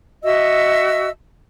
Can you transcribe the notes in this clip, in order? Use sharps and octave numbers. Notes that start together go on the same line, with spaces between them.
F#4 D#5 E5 E6